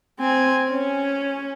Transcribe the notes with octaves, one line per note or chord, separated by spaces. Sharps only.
C4 G#5
C#4